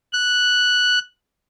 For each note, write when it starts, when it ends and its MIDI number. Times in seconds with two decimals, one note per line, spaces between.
0.13 0.99 90